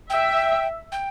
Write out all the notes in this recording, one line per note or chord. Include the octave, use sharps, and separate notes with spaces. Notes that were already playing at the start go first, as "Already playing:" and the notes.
E5 G5
G5